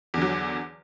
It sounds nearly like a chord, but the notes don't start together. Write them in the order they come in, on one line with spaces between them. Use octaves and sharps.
E2 D3 F#3